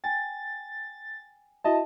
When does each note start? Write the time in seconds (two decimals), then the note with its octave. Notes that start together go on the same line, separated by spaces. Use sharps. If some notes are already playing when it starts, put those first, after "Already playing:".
0.04 G5 G#5 A6
1.64 E4 F#4 D#5 E5 A5